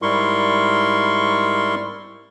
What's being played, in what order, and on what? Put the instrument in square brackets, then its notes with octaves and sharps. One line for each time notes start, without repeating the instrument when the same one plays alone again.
[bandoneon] G#2 G3 E4 A#4 C6 C#6